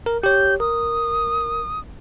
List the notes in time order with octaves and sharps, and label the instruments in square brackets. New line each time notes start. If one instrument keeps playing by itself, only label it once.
[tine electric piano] A#4
[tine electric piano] G4 C#5 [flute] G6
[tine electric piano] A#4 [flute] D#6